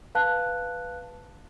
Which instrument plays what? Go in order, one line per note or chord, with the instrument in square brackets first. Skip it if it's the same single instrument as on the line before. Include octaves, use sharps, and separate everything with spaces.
[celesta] B4 F5 A5 F#6